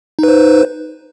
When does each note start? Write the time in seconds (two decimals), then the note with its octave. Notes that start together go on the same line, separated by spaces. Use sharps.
0.19 D#4
0.23 B4
0.28 C5